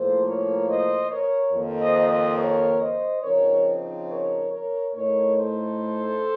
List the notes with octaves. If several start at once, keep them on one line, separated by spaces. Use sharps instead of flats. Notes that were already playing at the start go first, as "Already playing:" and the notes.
Already playing: A2 F3 A#3 A4 C5
A#4 C#5
C5 D#5
A#4 C#5
F2 D#3 A#3
C5 D#5
C5 D#5
A#4 C#5
C5 D#5
C#3 F3 C4 D#4 A#4 C#5
A#4 C#5
A#4 C#5
A2 A3 D#4 A#4 C#5
A4 C5